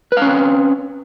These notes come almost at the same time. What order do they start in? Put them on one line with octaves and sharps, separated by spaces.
B4 F5 C#4 C4